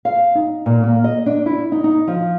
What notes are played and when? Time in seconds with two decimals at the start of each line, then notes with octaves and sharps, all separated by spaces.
0.05 F5
0.35 D#4
0.66 A#2
0.83 A#3
1.04 D#5
1.26 D4
1.46 E4
1.72 D#4
1.84 D#4
2.07 F3